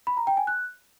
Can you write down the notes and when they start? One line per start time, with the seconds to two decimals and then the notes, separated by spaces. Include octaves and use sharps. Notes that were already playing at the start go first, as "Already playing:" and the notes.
0.07 B5
0.17 A#5
0.27 G5
0.37 G#5
0.47 F#6